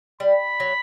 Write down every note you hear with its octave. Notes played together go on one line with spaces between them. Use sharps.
G3 B5
F#3